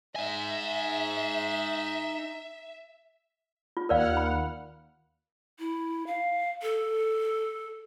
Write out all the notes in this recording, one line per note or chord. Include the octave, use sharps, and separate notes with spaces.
D#4 E5 G#5
F4
D#2 A#4 D5 F5 F#5 F6
B5
E4
F5
A4